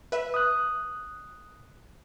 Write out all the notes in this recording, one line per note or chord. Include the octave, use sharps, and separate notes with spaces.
B4 E5
D#6 F#6